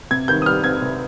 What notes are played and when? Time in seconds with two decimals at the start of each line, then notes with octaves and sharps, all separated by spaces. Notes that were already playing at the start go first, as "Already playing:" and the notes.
0.11 C3 G#6
0.28 D#3 G6
0.42 D#6
0.46 G3 F6
0.64 C4 G#6
0.82 C3